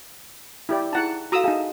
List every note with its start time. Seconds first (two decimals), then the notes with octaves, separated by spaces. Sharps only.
0.69 E4 G4 D5
0.93 D#4 E4 G#4 F#5 A5
1.32 F#4 A4 F5 A#5 D#6 E6
1.44 D#4 G#4 E5 F5 A5